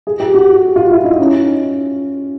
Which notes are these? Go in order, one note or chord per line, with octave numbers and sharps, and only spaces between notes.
G#4
G4
F#4
G4
F4
E4
D#4
C#4